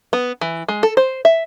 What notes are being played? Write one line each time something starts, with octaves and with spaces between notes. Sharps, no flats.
B3
E3
G#3
A4
C5
E5